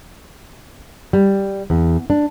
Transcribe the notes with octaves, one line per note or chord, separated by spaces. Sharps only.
G3
E2
D4